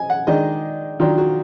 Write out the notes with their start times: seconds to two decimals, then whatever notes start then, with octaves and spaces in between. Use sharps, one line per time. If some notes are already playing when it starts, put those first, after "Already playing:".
Already playing: D#5 G#5
0.10 F#5
0.27 D#3 G#3 D4 D#5
1.00 D#3 F#3 D4 F4
1.18 F#4